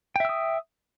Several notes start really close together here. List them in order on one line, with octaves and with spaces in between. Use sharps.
G5 E5 E6 D#6